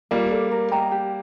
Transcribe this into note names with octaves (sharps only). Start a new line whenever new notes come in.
G3 A#3 F4
A4 D5
A#4
D#5 G5 A#5
G4